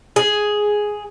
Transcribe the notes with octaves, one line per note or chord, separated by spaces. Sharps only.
G#4